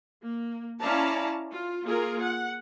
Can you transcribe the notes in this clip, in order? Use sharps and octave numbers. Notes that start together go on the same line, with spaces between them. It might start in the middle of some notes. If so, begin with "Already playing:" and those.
A#3
C#4 E4 D5 F5 A5 A#5
F4
A#3 F4 G#4 A#4
F#5